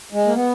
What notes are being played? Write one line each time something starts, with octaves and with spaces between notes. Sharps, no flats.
G#3
A#3
B3